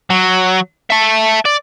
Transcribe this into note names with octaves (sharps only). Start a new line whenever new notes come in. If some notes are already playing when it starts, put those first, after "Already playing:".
F#3
E5 A5
D5